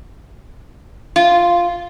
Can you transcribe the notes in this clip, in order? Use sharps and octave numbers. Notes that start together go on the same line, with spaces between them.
F4